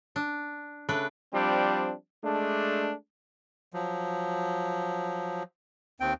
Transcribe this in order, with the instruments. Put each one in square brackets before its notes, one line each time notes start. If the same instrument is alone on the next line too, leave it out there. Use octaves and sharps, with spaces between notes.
[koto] D4
C#3 A3 D4 B4
[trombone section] F3 G3 C4 D4
G#3 A3 D4
[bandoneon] F3 F#3
D#2 C4 G5